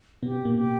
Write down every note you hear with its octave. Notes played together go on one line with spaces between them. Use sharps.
B2 B3 G4
A#2 A#3
G4